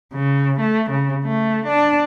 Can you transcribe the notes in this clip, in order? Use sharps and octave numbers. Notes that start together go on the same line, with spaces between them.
C#3
A3
C#3
A3
D4